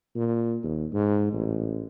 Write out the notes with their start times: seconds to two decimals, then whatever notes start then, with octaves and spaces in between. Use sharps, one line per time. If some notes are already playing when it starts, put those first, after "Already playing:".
0.15 A#2
0.64 D#2
0.93 G#2
1.32 A1